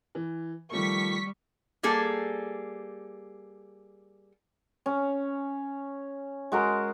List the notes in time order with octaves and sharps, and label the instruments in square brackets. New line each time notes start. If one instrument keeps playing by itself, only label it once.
[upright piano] E3
[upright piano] D#3 F3 A3 [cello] G3 [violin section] C#6 B6
[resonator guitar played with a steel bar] G3 A#3 G#4 A4
[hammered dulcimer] C#4
G#3 F#4 A#4